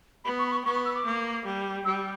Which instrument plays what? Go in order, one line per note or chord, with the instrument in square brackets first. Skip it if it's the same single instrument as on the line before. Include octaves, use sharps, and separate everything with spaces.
[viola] B3 [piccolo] B5
[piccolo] C#6
B5
C#6
[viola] B3 [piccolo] C#6
[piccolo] C#6
E6
D6
[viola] A#3
G3
[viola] G3 [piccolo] E6